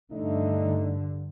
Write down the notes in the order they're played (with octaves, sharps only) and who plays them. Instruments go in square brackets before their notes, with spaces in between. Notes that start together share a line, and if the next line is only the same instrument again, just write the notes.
[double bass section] G2 D3 [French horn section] A3 D#4